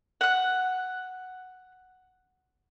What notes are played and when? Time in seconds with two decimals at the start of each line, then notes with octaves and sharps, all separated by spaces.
0.21 F#5 F#6